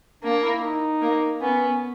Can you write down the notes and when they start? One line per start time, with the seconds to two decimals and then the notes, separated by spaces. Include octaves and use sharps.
0.23 A#3 D4
0.43 E4
0.63 D#4
1.02 A#3
1.41 B3 C#4